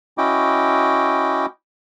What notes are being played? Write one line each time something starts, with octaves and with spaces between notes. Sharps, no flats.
C#4 E4 F#4 D#5 G5 D6